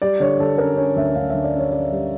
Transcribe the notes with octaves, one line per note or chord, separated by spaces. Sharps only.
G3 D5
D3 C#5
D3 A4
C#4 A#4
C#4 C#5
D2 E5
D2 F5
D2 E5
D5
C#4
C#5
C#4 D5
G3